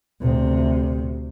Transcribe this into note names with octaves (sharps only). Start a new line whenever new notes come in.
D2 C3